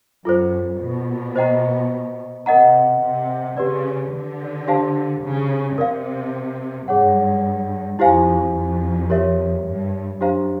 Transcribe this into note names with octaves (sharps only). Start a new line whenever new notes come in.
F#2 F4 A4 C5
B2
C5 D#5 G5 A#5
C3 A#4 D#5 F#5 A#5
C3
C#3 G4 B4 D5
D3
D4 G4 C5 F5 A5
C#3
C3 A#4 D5 F5
G2 G#4 C#5 F#5
F2 E4 G4 C5 F5 G#5
F2
G4 A#4 C#5 E5
G2
F#2 D4 G4 C5 F5 A#5